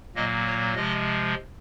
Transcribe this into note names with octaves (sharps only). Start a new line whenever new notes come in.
A#2 F#3 A#3 D#5
C#5
C3 F3 G#3 D#5